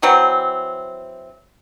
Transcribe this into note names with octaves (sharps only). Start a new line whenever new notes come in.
E3 F#3 C4